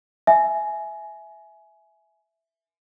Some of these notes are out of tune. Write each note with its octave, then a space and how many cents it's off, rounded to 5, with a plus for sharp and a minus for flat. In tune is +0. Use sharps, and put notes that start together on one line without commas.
E5 +0 G#5 +20